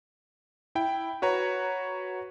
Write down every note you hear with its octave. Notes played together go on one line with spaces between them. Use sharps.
E4 G5
F#4 B4 C#5 A#5